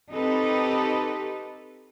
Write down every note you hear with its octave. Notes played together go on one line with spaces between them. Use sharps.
C4 D#4 G4 A4 B4